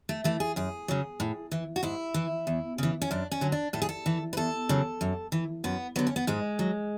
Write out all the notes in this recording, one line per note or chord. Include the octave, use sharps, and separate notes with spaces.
A3
E3 A3
G#4
F#2 G#4
C#3 F#3
A2
E3
F#4
G#2 E4
E3
E2
C#3 E3
C#4
F#2 D4
C#4
D3 F#3
D4
A2 A4
G#4
A4
E3
B4
E2 A4
C#3 F#3
F#2
E3
F#2 B3
D3 F#3 B3
C#4
B3
G#2 G#3
F#3